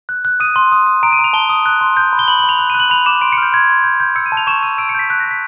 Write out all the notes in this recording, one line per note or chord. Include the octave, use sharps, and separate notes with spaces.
F#6
F#6
D#6 D#7
C6
D#6
D#6
A#5 D7
D#7
A#5
F7
A5 G7
D#6
F#6
C6
G6
B5
G7
B5 F#7
F#7
B5
F7
F#6
D#7
F#6
F#7
B5 F7
D6 E7
C6 D7
C#7
F6 G6
C6 G#6
C6
G6
G6
E6 C#7
D#7
A5
F7
C#6 E7
E6 D#7
E6 D7
C#7
G6 B6
F#6 B6
A#6
F#6
B6